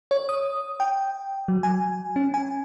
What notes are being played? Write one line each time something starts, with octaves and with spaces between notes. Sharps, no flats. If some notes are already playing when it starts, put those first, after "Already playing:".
C#5
D#6
G5
F#3
G#5
C#4
G#5